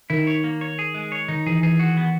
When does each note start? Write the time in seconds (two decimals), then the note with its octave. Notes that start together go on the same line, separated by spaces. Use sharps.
0.10 D#3 E4
0.27 C#5
0.44 A#3
0.61 C#5
0.79 G#4
0.94 G#3
1.12 C#5
1.28 D#3 D#4
1.46 E3 G#4
1.63 E3 G#4
1.80 F#4
1.97 B3